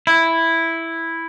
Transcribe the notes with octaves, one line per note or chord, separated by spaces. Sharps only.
E4